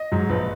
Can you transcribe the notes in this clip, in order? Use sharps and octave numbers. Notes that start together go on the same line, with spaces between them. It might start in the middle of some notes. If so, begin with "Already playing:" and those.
Already playing: D#5
G#2 F#3
A#1 B4